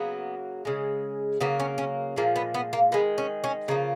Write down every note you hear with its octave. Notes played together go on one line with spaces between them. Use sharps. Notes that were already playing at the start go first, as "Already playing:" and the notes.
Already playing: C#3 F#3 A#3 B3
C#3 G#3
C#3 F#3 A#3 B3
C#4
C#4
A#2 F3 G#3 A#3
B3
B3
A#3
D#3 G#3 B3
C#4
C#4
C#3 F3 A#3 D#4